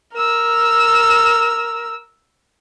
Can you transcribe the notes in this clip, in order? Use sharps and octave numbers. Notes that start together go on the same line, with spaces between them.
A#4 E6